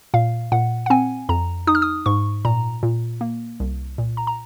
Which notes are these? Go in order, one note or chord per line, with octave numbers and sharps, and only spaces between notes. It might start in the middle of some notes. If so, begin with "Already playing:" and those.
A#2 F5
A#2 F#5
F#5
C4 G#5
F2 A#5
D#4 D#6
F6
D#6
G#2 C#6
A#2 A#5
A#2
A#3
C2
A#2
A#5
A#5